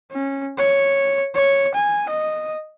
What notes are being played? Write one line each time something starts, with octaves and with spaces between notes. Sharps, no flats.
C#4
C#5
C#5
G#5
D#5